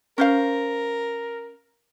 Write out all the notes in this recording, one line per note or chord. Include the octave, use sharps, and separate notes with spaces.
C#4 A#4 C5 F5